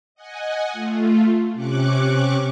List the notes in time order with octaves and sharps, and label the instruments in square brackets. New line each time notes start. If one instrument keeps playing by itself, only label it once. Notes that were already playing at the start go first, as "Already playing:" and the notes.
[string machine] D#5 F#5 G#5
A3 F4
C3 C#4 C#6 D6 F#6